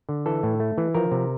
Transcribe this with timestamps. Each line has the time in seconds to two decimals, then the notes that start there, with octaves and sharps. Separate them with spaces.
0.09 D3
0.26 E3 A4
0.43 A2
0.60 A3
0.78 E3
0.95 F3 A#4
1.12 C3